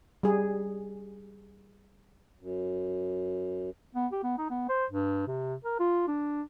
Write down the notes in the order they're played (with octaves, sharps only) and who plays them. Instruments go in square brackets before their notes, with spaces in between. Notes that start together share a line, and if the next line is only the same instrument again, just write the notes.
[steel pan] G3 G#4
[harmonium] F#2
[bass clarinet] B3
G4
B3
D#4
B3
C5
G2
C3
A#4
F4
D4